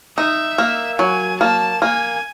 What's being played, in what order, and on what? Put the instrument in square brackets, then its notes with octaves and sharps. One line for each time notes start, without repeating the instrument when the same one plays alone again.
[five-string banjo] D#4 [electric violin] E5
[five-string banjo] A#3
[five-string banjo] F#3 [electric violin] G#5
[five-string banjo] A#3 [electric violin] A5
[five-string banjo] A#3 [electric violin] G#5